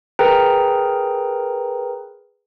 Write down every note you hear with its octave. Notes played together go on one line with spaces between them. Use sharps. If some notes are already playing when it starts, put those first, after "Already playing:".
G#4 A#4 B4 G5 A#5